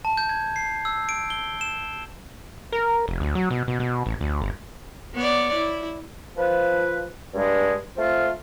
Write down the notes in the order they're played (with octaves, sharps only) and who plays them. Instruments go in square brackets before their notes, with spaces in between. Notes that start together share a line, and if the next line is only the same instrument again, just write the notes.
[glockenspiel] A5
G6
G#6
C7
E6
D7
G7
E7
[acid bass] A#4
F1
D2
F#3
B2
B2
B2
A1
D2
G1
[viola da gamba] B3 C#5 D5
E4
[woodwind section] F3 B4
G2 G#3
A3 C4 F4